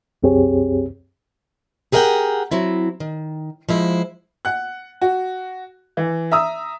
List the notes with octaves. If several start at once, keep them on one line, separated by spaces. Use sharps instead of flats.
C2 F#2 C4 G4 G#4 C#5
G4 G#4 A#4 D5 F#5 G5
F#3 C4 E4
D#3
F3 G#3 E4 C5
F#5 F#6
F#4
E3
E5 A#5 D#6 E6